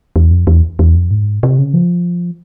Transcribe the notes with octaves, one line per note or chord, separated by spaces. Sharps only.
E2
F2
E2
E2
F2
G#2
C3
C#3
F3